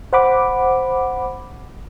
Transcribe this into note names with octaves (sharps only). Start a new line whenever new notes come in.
C5 F#5 B5 D6